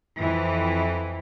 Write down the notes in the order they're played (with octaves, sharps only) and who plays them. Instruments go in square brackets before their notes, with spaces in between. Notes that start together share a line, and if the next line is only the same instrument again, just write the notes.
[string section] F2 E3